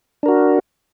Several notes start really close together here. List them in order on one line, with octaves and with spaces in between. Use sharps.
D4 A#4 F#4